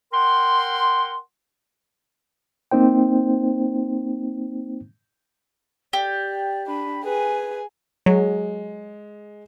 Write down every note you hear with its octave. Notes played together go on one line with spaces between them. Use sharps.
A#4 F#5 G5 C6
A#3 C4 D#4 C5 G5
G4 D5
D4 B5
G#4 B4 G#5
F#3 G#3